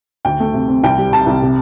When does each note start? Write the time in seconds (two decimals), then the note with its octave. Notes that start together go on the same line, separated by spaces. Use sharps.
0.25 D2 G5
0.40 A3
0.54 C3
0.68 C4
0.84 C2 G5
0.98 G3
1.12 C3 A5
1.27 C2
1.42 C3